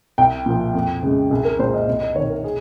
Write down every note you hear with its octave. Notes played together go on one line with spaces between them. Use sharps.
C2 G5
A#2 F3
F2
C#3 G#3
C2 G#4
A#4
A#2 G#3 C5
D#5
C2 D#5
D#5
C3 D#3 C#5
A#4
G#4